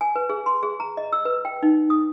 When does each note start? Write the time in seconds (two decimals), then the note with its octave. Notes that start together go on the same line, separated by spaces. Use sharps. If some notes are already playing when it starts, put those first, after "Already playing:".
0.01 G#5
0.16 B4
0.29 G#4
0.46 C6
0.63 G#4
0.80 A#5
0.97 D#5
1.12 E6
1.25 B4
1.45 G5
1.63 D#4
1.90 D#6